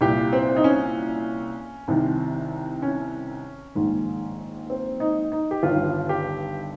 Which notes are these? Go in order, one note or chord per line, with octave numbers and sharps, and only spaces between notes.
C2 A#2 G4
C4
D#4
C#4
C2 C3 D#3
C#4
A#1 G#2 D#3
C4
D#4
D#4
G4
G1 G2 D#3 F4
G4